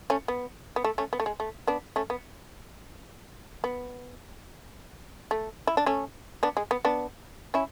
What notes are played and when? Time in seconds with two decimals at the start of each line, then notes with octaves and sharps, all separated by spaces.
0.10 A3 C#4
0.28 B3
0.76 B3
0.84 A3
0.98 A3 C#4
1.13 B3
1.20 A3
1.26 G#3
1.40 A3
1.67 B3 D4
1.96 A3 C#4
2.10 B3
3.64 B3
5.31 A3
5.67 E4
5.77 D4
5.86 A3 C#4
6.43 B3 D4
6.57 G#3
6.71 B3
6.85 B3 D4
7.54 C#4 E4